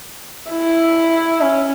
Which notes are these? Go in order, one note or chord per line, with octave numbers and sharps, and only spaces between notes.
E4
C#4